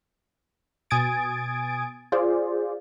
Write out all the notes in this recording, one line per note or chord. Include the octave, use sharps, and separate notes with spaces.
B2 G#5 D#6 G#6 A6 D7
F4 G#4 C5 D5